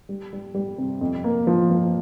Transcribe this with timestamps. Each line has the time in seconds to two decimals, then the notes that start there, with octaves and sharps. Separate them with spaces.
0.09 G3
0.33 G3
0.55 G3
0.78 C3
1.01 F2
1.24 A#3
1.47 F3
1.70 F3